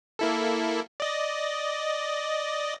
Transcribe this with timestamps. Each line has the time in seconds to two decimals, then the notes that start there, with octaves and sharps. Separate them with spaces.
0.19 A#3 E4 A4
1.00 D5 D#5